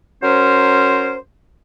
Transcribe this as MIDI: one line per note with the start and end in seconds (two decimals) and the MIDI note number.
0.23 1.17 54
0.23 1.17 61
0.23 1.17 70
0.23 1.17 72